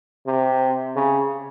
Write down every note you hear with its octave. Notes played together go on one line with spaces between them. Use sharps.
C3
C#3